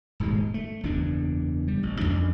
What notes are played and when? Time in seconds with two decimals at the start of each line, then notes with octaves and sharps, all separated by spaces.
0.20 D#1 G#2 B2 G#3
0.54 A3
0.83 F#1 E2 G2 D4
1.68 G3
1.83 A1
1.99 A1 F2 G#2 D4